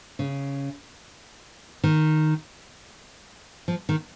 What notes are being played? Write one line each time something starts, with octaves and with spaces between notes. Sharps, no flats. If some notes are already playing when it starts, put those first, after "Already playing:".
C#3
D#3
F3
D#3